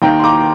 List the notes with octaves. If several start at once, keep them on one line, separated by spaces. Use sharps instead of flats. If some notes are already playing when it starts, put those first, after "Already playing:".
D#2 D#3 G5 A#5
C6
A#5 D6